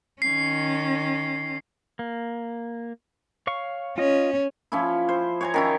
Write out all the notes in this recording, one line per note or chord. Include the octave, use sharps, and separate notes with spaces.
D#3 C#4 C7
A#3
C#5 F5 C#6
C#4 F4 D#5
F3 C#4 E4
C5
C#5 G#5 A#5
D#3 C#4 E4